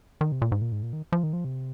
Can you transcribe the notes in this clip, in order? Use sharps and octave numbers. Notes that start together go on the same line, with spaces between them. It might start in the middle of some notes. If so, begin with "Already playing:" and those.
D#3
C3
A#2
G#2
A#2
G#2
A#2
D#3
F3
D#3
F3
C3